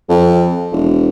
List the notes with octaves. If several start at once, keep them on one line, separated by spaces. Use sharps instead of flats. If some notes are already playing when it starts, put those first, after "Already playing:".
F2
E1